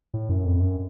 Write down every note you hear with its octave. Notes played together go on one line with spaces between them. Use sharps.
A2
F#2
F2
F#2